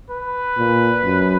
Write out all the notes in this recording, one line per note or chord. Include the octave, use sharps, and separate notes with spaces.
B4
A#2
F#2